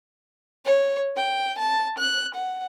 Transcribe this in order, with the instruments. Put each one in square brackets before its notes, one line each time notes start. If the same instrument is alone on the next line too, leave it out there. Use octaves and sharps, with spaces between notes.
[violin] C#5
G5
A5
F#6
F#5